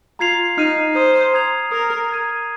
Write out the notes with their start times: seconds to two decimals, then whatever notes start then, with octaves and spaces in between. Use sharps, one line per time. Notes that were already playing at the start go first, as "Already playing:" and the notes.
0.19 F4 A#5 G#6 C7 F7
0.58 D#4 F6 C7 D#7
0.95 C5 A#5 D#6 C7 D#7
1.34 A#5 D#6 G#6 C7 F7
1.72 A#4 D#6 G#6 F7
2.10 A#5 F6 G#6 D#7